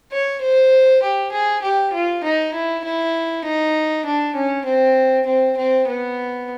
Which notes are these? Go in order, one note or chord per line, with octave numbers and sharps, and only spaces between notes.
C#5
C5
G4
G#4
G4
F4
D#4
E4
E4
D#4
D4
C#4
C4
C4
C4
B3